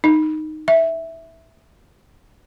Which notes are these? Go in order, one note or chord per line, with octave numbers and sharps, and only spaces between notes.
D#4
E5